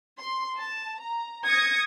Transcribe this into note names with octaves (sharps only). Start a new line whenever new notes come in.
C6
A5
A#5
D#6 G#6 A#6 C#7